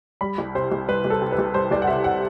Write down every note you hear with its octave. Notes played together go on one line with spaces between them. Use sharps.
G3 B5
C2
C3 C5
C2
G3 B4
C2
A4
C3
B4
C2
G3 C5
C2 D5
F#5
C3 E5
F#5